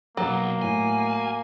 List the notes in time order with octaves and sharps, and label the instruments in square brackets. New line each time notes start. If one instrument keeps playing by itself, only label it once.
[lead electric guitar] B1 F2 [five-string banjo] F#3 [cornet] A#3
[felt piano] A2 [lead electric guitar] G#5